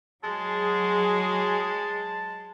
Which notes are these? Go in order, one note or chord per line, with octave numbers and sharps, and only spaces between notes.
F#3 G#3 G#4 A5